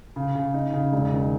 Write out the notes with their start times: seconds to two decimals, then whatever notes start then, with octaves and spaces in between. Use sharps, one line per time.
0.16 C#3
0.35 C#3
0.54 D#4
0.73 C#3
0.92 E1
1.12 D#3